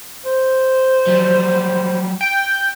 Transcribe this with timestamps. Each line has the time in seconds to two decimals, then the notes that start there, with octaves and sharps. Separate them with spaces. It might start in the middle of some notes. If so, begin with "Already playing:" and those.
0.25 C5
1.07 F#3 G3
2.21 G5